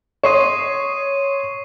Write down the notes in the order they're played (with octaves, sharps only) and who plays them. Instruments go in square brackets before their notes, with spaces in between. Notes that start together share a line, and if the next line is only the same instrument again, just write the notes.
[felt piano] C#5 C6 D#6 [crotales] C#6 C7 D#7